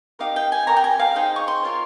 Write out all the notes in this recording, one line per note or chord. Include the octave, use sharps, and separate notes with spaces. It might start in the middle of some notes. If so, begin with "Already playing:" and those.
D#4 G4 A#4 D#5 F5
G5
G#5
G4 A#4 C#5 A#5
G5
G#5
F5
D#4 G#4 C5 G5
C#6
C6
F4 A#4 C#5